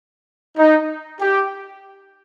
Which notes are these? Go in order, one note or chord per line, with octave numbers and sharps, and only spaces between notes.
D#4
G4